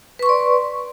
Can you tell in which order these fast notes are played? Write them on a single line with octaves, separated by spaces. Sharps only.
B4 C#6 C6 D5